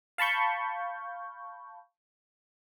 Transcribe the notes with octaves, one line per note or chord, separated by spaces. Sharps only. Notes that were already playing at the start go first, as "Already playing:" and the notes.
F5 A5 B5 C#6 G6